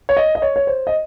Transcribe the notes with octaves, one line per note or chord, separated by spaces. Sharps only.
C#5
D#5
D#5
C#5
C#5
C5
D#5